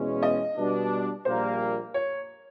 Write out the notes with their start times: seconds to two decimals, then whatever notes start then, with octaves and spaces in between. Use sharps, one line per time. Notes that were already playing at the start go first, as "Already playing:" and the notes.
Already playing: E2 B2 G#3 C#4
0.23 D#5
0.57 B2 G3 B3 D4
1.25 A#1 A#2 G3 A#3 C5
1.94 C#5